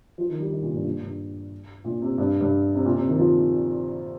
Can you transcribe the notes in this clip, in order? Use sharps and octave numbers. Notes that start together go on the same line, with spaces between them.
F3
D#3
G3
D#3
A#2
G2
A#2
G2
A#2
C3
G2
G2
C3
A#2
C3
D#3
F3